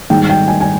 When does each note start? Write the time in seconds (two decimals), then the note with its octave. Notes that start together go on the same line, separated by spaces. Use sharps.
0.10 G#2 D#3 G3 G5
0.29 G5
0.48 G#5
0.61 G#5